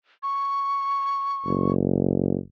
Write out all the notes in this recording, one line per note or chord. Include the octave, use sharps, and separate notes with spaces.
C#6
F#1